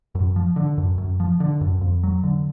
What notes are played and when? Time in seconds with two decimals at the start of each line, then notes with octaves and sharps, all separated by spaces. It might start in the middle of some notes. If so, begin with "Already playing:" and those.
0.15 F#2
0.36 F3
0.56 D3
0.78 F#2
0.98 F#2
1.20 F3
1.40 D3
1.61 F#2
1.81 F2
2.03 F#3
2.23 D3